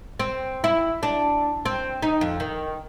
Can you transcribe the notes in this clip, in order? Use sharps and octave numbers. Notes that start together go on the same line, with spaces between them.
C4
E4
D4
C4
D#4
F2
D#3